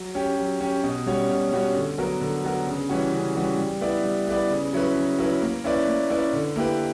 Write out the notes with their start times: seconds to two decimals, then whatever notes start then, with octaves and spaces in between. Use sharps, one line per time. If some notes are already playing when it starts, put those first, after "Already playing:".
Already playing: F#3
0.15 C#4 G4
0.38 F#3
0.61 C#4 G4
0.84 B2
1.06 G3 C#4 F#4 C#5
1.29 B2
1.52 G3 C#4 F#4 C#5
1.75 D3
1.98 F#3 B3 F#4 A#4
2.21 D3
2.44 F#3 B3 F#4 A#4
2.67 C#3
2.89 E3 G3 C#4 F#4
3.12 C#3
3.35 E3 G3 C#4 F#4
3.58 G3
3.81 B3 E4 B4 D5
4.04 G3
4.27 B3 E4 B4 D5
4.50 C#3
4.73 F#3 C#4 E4 B4
4.96 C#3
5.19 F#3 C#4 E4 B4
5.42 A#3
5.64 C#4 E4 B4 D5
5.87 A#3
6.10 C#4 E4 B4 D5
6.33 D3
6.56 A#3 E4 G4 B4